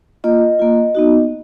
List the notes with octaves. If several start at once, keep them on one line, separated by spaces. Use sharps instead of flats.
A#3 F4 D#5
A#3 F4
B3 D#4 F#4